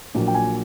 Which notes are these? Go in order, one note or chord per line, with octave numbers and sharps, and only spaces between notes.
A#1 A#2 F#3
G5
G#5